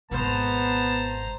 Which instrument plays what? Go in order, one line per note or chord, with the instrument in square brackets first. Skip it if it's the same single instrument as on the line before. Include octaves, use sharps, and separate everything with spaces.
[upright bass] G#1 B2 [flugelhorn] B3 [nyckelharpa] C5 A#5 [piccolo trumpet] A5